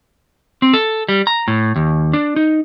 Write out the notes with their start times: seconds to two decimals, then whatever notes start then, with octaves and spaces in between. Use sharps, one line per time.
0.62 C4
0.74 A4
1.09 G3
1.27 A#5
1.48 A2
1.76 D#2
2.13 D4
2.36 D#4